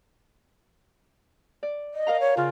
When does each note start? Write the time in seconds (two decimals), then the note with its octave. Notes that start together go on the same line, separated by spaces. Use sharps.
1.63 D5
1.94 D#5
2.07 A#4 F5 A#5
2.20 C#5
2.37 C#3 F4